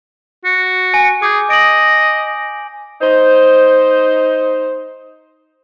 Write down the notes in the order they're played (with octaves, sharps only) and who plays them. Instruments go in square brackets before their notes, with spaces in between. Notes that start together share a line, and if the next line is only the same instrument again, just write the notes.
[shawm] F#4
[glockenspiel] G#5
[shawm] G#4 [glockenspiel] D6 G6
[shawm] D#5 [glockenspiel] D7 F#7
[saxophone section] D#4 C5